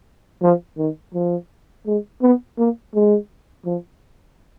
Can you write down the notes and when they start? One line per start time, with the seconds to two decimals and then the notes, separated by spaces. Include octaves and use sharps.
0.43 F3
0.78 D#3
1.14 F3
1.87 G#3
2.22 B3
2.58 A#3
2.94 G#3
3.66 F3